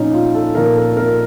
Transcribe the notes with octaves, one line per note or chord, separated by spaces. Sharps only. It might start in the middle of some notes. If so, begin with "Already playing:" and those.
Already playing: A#2 F3 C#4 D#4
F4
A4
A#2 F3 A#4
A4
A#4